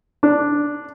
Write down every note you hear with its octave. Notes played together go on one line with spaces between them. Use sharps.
D4